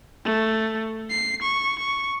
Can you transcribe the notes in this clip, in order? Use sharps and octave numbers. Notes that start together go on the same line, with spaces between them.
A3
C7
C#6
C#6